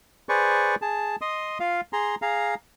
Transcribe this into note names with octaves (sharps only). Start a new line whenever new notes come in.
G#4 B4 C5 D5 C#6
G#4 A5
D#5 C6 D#6
F4 F5
G#4 A#5 C6
G#4 F5 A#5